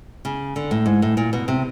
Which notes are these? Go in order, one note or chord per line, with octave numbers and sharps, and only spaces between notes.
C#3
D3
A2
G#2
A2
A#2
B2
C3